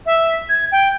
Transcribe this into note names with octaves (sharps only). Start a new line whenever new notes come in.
E5
G#6
G5